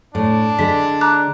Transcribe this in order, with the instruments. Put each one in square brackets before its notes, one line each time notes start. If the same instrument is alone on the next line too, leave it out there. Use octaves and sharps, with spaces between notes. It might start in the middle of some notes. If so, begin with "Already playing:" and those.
[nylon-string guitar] A2 [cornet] D4
[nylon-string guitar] D3 G#3 [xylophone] B6
[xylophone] A#5 D6 F#6